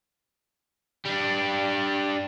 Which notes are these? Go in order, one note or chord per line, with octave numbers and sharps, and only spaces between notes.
G3 D4